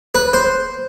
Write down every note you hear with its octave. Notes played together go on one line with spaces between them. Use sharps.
B4
C5